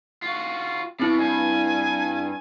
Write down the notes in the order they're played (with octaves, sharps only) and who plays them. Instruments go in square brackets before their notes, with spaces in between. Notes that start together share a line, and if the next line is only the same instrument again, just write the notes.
[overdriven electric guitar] F4 F#4
[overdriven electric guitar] B2 [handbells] C4 E4
[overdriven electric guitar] G2 [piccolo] G#5